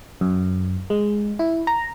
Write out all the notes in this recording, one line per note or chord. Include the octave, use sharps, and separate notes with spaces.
F#2
G#3
E4
A#5